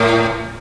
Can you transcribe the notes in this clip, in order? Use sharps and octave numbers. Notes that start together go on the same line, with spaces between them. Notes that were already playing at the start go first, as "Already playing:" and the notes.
Already playing: A2